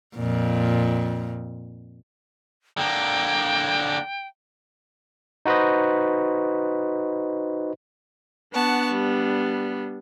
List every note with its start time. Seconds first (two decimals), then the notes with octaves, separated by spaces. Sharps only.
0.15 F2 A#2
2.77 D3 A#3 G5
5.46 D#4 F#4 B4 C5 D#5
8.54 B3 D4 F#5 A5 C#6
8.91 G3